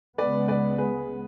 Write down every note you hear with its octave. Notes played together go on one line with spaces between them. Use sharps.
C#2 C#3 G#3 B3 B4 D5
B4 D5
G#4 B4